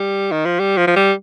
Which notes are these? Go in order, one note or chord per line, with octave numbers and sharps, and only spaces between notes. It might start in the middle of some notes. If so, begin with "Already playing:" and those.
Already playing: G3
D#3
F3
G3
F3
F3
G3